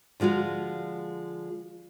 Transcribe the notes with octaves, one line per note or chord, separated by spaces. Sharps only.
D3 F3 G#3 F4 F#4